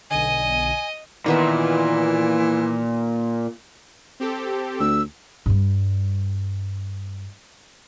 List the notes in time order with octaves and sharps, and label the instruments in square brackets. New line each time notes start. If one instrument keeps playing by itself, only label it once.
[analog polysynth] B1 D3 [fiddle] D#5 [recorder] G#5
[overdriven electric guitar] A#2 [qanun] D#3 B3 E5 [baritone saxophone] E3
[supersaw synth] C4 G4 A4
[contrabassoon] D2 [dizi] E6
[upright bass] G2 G3